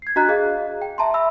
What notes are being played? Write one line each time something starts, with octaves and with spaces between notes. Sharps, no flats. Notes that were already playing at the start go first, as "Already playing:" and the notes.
G#6 C7
D4 F#4 D#5 A#5 F#6
G#4 D#5 F5
G5
E5 A5 A#5 C6
E5 B5 E6